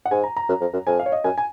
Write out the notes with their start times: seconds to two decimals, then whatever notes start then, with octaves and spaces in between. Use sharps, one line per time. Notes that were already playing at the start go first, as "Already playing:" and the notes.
0.05 F#5
0.11 G#2 G#5
0.24 A#5
0.36 A#5
0.49 F#2
0.61 F2
0.73 F#2
0.87 F2 G#5
0.99 F5
1.06 C#5
1.12 D#5
1.24 F#2 G#5
1.38 G#5